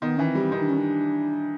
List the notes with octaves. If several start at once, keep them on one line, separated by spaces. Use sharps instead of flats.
D#3 B3
E3 C#4
C4
G3
D#3 D#4
D4
C#4
D4